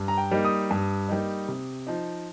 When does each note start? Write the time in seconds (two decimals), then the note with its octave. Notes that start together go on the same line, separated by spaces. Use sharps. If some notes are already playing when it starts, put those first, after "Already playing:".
Already playing: G2
0.08 A#5
0.18 G5
0.31 G3 A#3 D#4
0.45 D#6
0.71 G2
1.08 G3 A#3 D#4
1.48 C3
1.87 F3 D#4